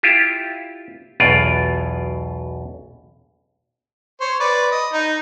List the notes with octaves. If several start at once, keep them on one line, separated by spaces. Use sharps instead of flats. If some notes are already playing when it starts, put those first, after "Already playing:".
E4 F4 G4
B1 E2 B2 F4 D5
C5 C#5
B4 D5
D#5
D#4